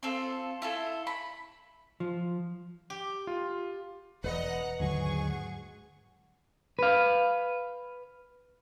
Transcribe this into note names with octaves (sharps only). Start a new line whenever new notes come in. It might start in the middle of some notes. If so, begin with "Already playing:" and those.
C4 F4 A4
E4 F4 A4
B5
F3
G4
F4
E1 B4 D5 D#5 F#5 A#5
D#2 G#2 D3 F#3 G#4 F#5 C#6
B4 F5